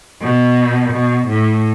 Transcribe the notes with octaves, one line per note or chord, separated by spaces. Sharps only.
B2
B2
A2